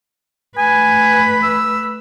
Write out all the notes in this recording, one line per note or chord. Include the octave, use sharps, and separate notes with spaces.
A3 B4 G#5
E6